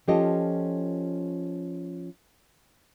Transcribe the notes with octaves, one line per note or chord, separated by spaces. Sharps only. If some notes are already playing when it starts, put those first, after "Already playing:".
F3 C#4 F4 G4 A4 D#5